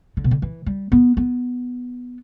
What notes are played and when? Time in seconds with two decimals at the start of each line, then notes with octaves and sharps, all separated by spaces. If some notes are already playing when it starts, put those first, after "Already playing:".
0.17 D3
0.24 B2
0.31 D3
0.42 E3
0.66 G3
0.92 B3
1.17 B3